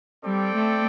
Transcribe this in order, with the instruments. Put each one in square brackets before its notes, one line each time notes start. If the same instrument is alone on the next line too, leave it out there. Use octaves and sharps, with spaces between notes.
[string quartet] G3 [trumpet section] C4 A4 D5 G5
[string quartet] A3